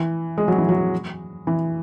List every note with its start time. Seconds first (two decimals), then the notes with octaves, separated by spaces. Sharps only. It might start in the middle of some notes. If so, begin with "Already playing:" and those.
Already playing: E3
0.38 G#3
0.48 F#3
0.58 E3
0.69 F#3
1.47 E3